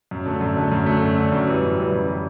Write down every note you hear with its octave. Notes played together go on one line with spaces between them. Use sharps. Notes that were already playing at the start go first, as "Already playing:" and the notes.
F#2
D3 A3
F#2
D3 A3
F#2
D3 A3
F#2
D3 A3
F#2
E3 G3
F#2
E3 G3
F#2
E3 G3